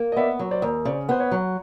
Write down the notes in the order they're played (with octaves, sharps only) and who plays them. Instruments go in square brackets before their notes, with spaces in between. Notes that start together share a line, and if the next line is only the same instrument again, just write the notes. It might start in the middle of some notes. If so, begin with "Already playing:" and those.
Already playing: [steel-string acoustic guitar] A#3
[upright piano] D#5
[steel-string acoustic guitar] B3 [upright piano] D5 E5
[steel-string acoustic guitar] F#3
[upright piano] C5 D5
[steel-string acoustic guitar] D#2
[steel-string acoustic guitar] C#3 [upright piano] C5 D5
[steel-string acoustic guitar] B3 [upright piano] C5
[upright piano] B4 C#5
[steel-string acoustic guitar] F#3